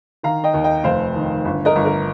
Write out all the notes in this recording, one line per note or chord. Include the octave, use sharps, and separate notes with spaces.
D#3 F5 A#5
D#5 G5
D#2
D#5 G5
F1 C5 F5
D#3
G1
A#4 D#5
G1
A#4